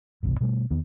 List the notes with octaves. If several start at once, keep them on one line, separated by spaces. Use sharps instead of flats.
G1 C2 B2 E3
B2 G3 A3
E2 D#3 B3